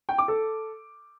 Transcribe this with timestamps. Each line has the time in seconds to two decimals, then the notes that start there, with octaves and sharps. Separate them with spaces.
0.09 G5
0.18 D6
0.28 A4